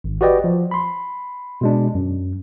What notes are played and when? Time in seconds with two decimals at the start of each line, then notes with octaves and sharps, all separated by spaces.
0.04 G#1
0.21 F#4 G4 B4 D5 D#5 G5
0.44 F3
0.71 B5 C6
1.61 B2 G#3 D4
1.95 F#2